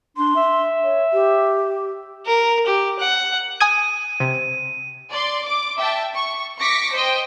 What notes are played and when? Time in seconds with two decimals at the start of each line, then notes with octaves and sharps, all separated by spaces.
0.17 D4 C6
0.36 E5
0.84 C#5
1.13 G4
2.26 A#4
2.67 G4
2.99 F#5
3.60 G#5 D#6 G#6 D#7
4.20 C3
5.10 D5 C6
5.44 D6
5.77 E5 G5 A5
6.14 C#6
6.59 C#6 D6 A#6 B6 C#7 D7
6.93 C5 D#5 G5